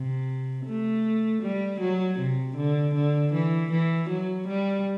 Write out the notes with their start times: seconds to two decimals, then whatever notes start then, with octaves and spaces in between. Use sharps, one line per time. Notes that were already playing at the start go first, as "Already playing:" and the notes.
Already playing: C3
0.66 A3
1.42 G3
1.80 F#3
2.19 C3
2.56 D3
2.94 D3
3.33 E3
3.71 E3
4.09 F#3
4.48 G3